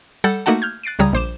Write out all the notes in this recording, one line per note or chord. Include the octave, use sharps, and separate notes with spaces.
G3 A4 F#5 G6 A6
A3 A#3 D#4 F#4 F#5 A5
F6 G6 G#6
F#6 A6 C7 D7 D#7
C#2 C#3 G3 A#5 D#6 G#6
A#1 C5 D6 E7